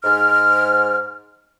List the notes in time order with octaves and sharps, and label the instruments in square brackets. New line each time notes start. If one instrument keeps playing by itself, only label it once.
[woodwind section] G#2 F6